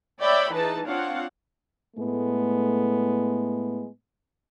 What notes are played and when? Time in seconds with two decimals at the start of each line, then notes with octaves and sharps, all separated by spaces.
0.20 C#5 D5 E5 G5 B5
0.53 E3 D#4 G#4 B4 A5
0.87 C4 D4 F4 C#5 F5 F#5
1.96 A2 G#3 A3 B3